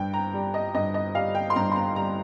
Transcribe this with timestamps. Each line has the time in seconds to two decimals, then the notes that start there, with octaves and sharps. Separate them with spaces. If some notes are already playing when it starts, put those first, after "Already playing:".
Already playing: G2 G5
0.13 A#5
0.33 G3
0.54 D#5
0.74 G2 D#5
0.94 D#5
1.15 G3 F5
1.35 G5
1.50 C6
1.56 G2 A#5
1.72 C6
1.76 A#5
1.96 G3 A#5